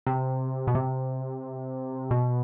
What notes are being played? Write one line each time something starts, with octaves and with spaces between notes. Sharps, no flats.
C3
B2
C3
B2